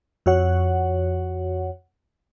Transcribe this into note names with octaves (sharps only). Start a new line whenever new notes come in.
F2 F#4 C#5 F#5